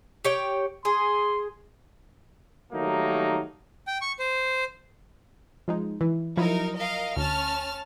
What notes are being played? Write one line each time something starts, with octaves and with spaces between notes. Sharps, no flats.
G4 C#5 G5
G#4 C6
D#3 F#3 G3 A3 A#3 D#4
G5
C#6
C5
F3 G#3 D#4
E3
F3 F#3 D#4 E4 A#4
A#4 D#5 F5
D2 C#4 A5 F6